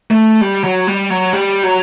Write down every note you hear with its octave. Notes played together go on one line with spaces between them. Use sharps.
A3
G3
F#3
G3
F#3
G3
F#3